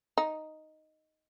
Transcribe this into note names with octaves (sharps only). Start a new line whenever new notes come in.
D#4